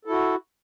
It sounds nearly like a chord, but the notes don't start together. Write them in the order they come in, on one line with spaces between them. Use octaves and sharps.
A4 E4 F#4